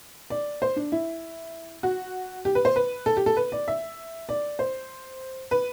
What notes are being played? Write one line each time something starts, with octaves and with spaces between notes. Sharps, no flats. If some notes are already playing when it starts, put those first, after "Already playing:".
D5
C5
D4
E4
F#4
G4
B4
C5
B4
A4
G4
A4
B4
D5
E5
D5
C5
B4